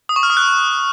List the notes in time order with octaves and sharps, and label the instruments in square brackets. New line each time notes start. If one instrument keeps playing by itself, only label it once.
[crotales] D#6
C#6
F6
D#6
F#6